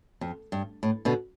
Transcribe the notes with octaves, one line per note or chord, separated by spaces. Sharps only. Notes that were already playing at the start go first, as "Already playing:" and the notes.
F2
G2
A2
B2 D3